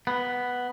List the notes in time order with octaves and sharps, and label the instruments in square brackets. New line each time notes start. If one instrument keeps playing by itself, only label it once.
[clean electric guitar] B3